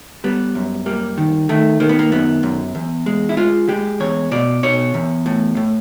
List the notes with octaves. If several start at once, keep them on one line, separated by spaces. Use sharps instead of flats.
G3 B3
F#2
G3 A#3
D#3
D#3 A3
D#3 A#3
B3
A#3
F#2 B3
F#2
E2
G#3
E4
G#3 F4
G#3 G4
E2 C#5
B2 D5
B2 C#5
E2
A2
A2